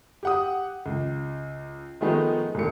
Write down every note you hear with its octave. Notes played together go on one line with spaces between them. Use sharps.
G4 F#5 D#6
C#2
D#3 F3 G#3 A3 B3 D#4
E1 D2 C#7